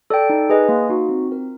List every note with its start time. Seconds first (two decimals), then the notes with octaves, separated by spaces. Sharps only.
0.10 A4 D5 G5
0.30 D#4
0.50 G#4 B4 D#5 G#5
0.69 A#3
0.89 D#4 F#4
1.09 C4
1.28 F4 A#4